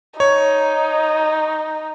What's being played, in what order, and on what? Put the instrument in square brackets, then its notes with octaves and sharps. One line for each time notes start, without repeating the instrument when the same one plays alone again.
[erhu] D#4 [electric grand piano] C#5